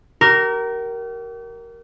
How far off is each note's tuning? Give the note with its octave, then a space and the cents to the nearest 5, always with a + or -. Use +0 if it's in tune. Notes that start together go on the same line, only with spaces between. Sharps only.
G4 -40 A#4 +0